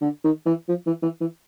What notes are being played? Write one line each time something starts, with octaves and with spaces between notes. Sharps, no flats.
D3
D#3
E3
F3
E3
E3
E3